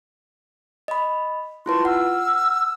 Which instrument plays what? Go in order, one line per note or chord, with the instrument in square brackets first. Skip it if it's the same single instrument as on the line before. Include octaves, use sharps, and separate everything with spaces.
[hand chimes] D#5 B5
[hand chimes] E4 F4 B4 [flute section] A5 C6 C#6
[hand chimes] F#5 [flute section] E6 F6